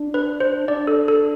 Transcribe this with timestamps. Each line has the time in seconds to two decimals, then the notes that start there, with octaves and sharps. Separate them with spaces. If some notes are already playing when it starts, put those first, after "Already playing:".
Already playing: D4
0.14 B4
0.40 C5
0.68 D4 D5
0.87 A4
1.08 A4